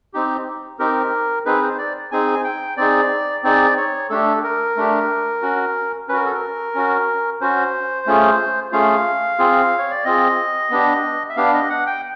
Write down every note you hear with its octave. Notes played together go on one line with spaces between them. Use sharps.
C4 D#4 G4
C4 D#4 G4 A#4
C4 D#4 G#4 B4
C5
D5
C4 D#4 G#4 G#5
G5
C4 D#4 G#4 D5
C4 D#4 G#4 D5
C#5
A3 D4 G4 A4
A#4
A3 D4 G4
C#4 F#4
C#4 F#4 A#4 B4
A4
A#4
C#4 F#4
C#4 F#4 C5
A3 C#4 F4 G#4
A3 C#4 F4 G#4 F5
C4 F4 G#4
C#5
D5
C4 F4 G#4 D#5
B3 D4 G4
E5
B3 D4 G4 F5
D#5
F#5
G5